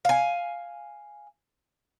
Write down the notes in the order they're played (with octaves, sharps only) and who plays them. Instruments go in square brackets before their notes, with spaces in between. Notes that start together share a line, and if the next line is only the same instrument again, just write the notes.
[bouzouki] F5 G#5